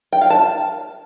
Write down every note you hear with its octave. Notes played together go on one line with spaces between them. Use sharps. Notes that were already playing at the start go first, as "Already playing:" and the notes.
G5
F5
A5